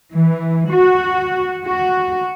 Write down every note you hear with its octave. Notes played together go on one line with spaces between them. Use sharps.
E3
F#4
F#4